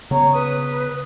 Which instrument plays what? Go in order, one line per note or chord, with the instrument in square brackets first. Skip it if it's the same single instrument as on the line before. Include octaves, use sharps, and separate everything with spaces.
[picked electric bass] C#3 B3 [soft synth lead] C#5 [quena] A#5
[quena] B4 [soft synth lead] D#6